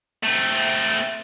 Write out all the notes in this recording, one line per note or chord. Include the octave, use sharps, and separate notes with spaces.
A3 C4